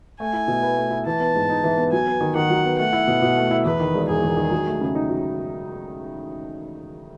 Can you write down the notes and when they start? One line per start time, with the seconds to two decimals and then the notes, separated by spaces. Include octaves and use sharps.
0.20 A3 G#5
0.33 E4
0.48 B2
0.63 B4
0.77 A3
0.91 E4
1.06 E3 A5
1.20 B3
1.35 G#2
1.49 D#4
1.64 E3
1.77 B3
1.93 F#3 G#5
2.07 B3
2.21 D#3
2.35 D#3 F#5
2.50 F#3
2.65 B3
2.79 A3 F#5
2.93 E4
3.08 B2
3.22 B2
3.37 A3
3.51 E4
3.65 E2 B4
3.80 D#3
3.95 E1
4.09 E1 G#4
4.23 E2
4.37 D#3
4.51 F#3
4.67 A3
4.81 C#3
4.95 D#4
5.09 F#3